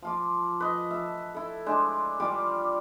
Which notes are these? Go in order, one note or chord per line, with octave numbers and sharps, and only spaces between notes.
F3 F4 D6
B4 D#5
E5 A5
E4 A4
G#3 D4 C5
G3 F4 D5 D6